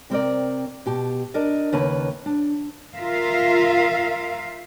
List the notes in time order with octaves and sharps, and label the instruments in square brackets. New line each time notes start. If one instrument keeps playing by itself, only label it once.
[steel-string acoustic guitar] C3 C4 A#4 D5
B2 G4 A5
D4 A#4 D5 D#5
D#2 C#3 A#3 B4 A5
D4
[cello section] F4 A#4 E5 F5